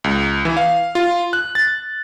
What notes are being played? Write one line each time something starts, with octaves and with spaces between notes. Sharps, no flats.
C#2
E3
F5
F4
F#6
A6